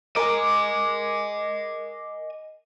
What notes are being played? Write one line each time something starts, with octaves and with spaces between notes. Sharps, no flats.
A#4 D#5 G#5 D6